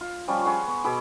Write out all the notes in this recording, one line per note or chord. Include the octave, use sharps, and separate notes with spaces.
F4
F3 G3 C#4 C#5
G#4 C#5 F#5 C6
B3
B2 G#4 B5 D6